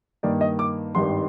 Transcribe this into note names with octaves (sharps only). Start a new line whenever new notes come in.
G2 D#3 A#3 D5
D#5
D6
G#1 G2 D#3 G3 C6